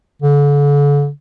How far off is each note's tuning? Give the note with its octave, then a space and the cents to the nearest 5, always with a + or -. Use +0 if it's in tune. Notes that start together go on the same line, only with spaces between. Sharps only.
D3 -40